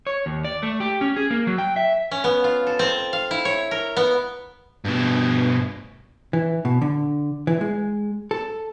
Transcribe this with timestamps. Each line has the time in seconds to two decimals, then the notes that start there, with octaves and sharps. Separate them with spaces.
0.07 C#5
0.26 D#2
0.44 D5
0.63 A3
0.80 G4
1.01 C#4
1.16 G#4
1.31 A#3
1.47 F#3
1.58 G5
1.76 E5
2.11 C#4
2.24 B3
2.44 F4
2.67 A4
2.79 C4
3.13 F5
3.31 E4
3.45 C#5
3.71 A#4
3.97 B3
4.85 G2 B2
6.33 E3
6.65 B2
6.82 D3
7.47 E3
7.61 G#3
8.31 A4